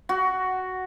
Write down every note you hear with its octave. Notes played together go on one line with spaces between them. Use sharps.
F#4